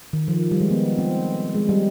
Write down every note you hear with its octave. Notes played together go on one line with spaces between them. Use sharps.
D#3
F3
G3
G#3
B3
C4
G#3
G3